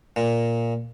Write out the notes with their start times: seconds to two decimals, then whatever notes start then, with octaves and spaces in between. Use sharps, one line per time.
0.16 A#2